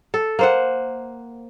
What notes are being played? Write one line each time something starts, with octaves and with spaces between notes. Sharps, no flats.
A4
A#3 C5 F#5